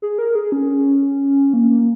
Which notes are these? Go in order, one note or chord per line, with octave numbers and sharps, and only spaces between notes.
G#4
A#4
G#4
C#4
A#3
A#3